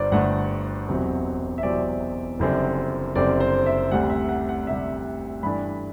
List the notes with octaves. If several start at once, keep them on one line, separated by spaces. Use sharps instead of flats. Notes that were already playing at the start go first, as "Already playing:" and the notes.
Already playing: G1 G2 D4 C5 D5
G1 G2 D3 A3 D4 F#5
E1 E2 C3 F#3 C4
E5
E1 E2 C3 F#3 C4 D5
F#1 F#2 D3 G3 C4
F#1 F#2 D3 G3 C4 D5
C5
E5
D2 C3 G3 F#5
E5
F#5
F#5
D2 C3 G3 E5
G2 E3 A3 D4 B5